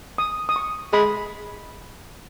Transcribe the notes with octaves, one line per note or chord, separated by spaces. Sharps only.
D#6
D#6
C#6
G#3 B5